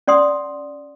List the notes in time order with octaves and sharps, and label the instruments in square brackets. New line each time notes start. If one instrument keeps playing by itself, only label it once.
[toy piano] C#4 D5 F#5 C6 D#6